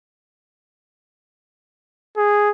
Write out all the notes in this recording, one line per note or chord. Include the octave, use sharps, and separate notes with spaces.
G#4